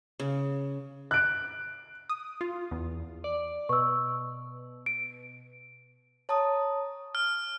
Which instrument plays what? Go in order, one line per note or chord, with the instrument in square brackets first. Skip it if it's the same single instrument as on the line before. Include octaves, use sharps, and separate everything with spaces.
[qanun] C#3
[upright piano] F#6 D7
[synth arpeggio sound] D#6
F4
E2
[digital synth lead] D5
[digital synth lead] B2 [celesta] C#6 E6
[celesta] D7
[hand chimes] C#5 A5 A#5 D#6
[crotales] F6